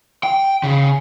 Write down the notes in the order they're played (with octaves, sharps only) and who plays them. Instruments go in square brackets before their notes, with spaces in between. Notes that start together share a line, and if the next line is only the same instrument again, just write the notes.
[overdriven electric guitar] G5
C#3